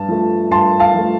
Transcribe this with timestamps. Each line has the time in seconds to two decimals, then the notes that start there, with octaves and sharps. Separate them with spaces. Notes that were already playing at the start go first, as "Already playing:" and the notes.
Already playing: G2 A5
0.08 F3 A3
0.51 G2 A5 C6
0.79 F5 A5
0.94 F3 A3